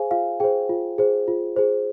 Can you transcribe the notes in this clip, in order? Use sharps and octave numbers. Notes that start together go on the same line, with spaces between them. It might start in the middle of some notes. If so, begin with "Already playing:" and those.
Already playing: G#4 C5 F5 G#5
F4 F5
G#4 C5 G5
F4
G#4 C5
F4
G#4 C5